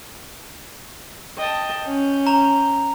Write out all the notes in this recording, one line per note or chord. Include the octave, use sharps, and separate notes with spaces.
D#5 G5 A5
C#4 G6
A#5 F7